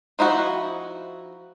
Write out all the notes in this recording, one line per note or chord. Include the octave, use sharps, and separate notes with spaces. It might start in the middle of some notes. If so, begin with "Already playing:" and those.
F3 D#4 E4 F#4